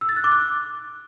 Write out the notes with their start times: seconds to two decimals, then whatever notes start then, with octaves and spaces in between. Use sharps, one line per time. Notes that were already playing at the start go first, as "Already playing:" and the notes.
0.01 E6
0.09 A6
0.16 F#6
0.24 D6
0.32 F#6